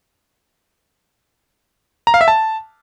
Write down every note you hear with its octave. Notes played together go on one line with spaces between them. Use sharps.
A#5
F5
E5
A5